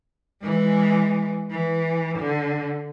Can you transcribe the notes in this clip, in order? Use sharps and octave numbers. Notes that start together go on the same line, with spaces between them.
E3 G#3
E3
D3